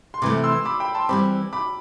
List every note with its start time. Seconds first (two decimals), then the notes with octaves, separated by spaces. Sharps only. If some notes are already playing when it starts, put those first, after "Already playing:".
0.14 C6
0.22 C3 E3 A3 B5 D6
0.44 C6 E6
0.65 B5 D6
0.80 G5 B5
0.95 A5 C6
1.09 E3 G3 C4 B5 D6
1.53 B5 D6